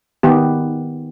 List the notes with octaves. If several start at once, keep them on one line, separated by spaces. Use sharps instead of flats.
D#3 B3 G4